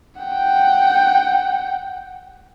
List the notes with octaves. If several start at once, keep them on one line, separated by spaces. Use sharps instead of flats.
F#5 G5